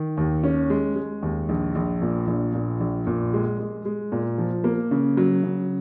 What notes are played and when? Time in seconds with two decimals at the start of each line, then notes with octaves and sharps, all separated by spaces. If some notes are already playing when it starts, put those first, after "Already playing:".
Already playing: D#3
0.17 D#2
0.44 C#4
0.70 G#3
0.96 G#3
1.22 D#2
1.49 A#1
1.75 A#1
2.01 A#2
2.27 A#1
2.54 A#2
2.80 A#1
3.07 A#2
3.33 G#3
3.59 G#3
3.85 G#3
4.12 A#2
4.38 F3
4.64 A#3
4.91 C#3
5.17 F#3
5.43 C#3